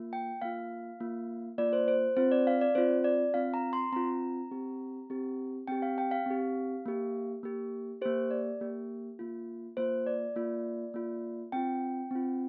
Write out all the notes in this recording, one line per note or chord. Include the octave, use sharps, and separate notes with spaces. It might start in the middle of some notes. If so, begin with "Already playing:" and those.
Already playing: A#3 F4
G5
A#3 F4 F5
A#3 F4
A#3 F4 D5
C5
C5
C4 F4 C5
D5
F5
D5
C4 F4 C5
D5
C4 F4 F5
A#5
C6
C4 F4 A#5
C4 G4
C4 G4
C4 G4 G5
F5
G5
F5
C4 G4
A#3 G4
A#3 G4
A#3 G4 C5
D5
A#3 G4
A#3 F4
A#3 F4 C5
D5
A#3 F4
A#3 F4
C4 F4 G5
C4 F4